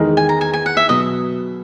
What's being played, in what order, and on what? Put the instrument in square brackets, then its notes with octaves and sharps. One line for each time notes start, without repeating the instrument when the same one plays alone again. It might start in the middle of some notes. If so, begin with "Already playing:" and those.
Already playing: [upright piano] E2 D#3 G#3 D#4 A#4
[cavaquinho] G#5
A#5
G#5
G#5
F#5
E5
[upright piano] B2 F#3 [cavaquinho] D#5